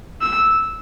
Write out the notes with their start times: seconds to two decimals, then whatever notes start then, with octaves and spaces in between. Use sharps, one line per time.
0.21 E6